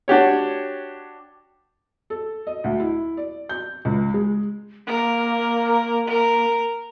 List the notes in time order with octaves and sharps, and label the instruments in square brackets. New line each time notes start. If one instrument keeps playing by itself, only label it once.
[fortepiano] D4 F#4 G4 C#5
[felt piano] A4
D#5
D2
E4
D5
G6
C#2
G#3
[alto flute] A#3 [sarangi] A#4
[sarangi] A#4